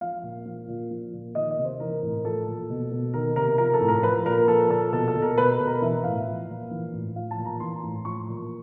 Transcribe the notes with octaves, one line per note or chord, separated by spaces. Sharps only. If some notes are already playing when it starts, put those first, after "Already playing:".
F3 F5
A#2
F3
A#2
F3
A#2
D#3 D#5
D#5
C3
C5
E3 A#4
A2
F3 A4
A#2
B2
B2
D#3 A#4
C3 A#4
F3 A#4
A4
A2
A#4
F3 B4
A#2 A#4
F3 A4
A#2 A4
B2 A4
A4
B2
A#4
B2 B4
B2
A#4
E3 E5
A2 F5
F3
A#2
E3
A2
F3 F5
A5
A#2
A#5
E3 C6
A2
F3 C#6
A#2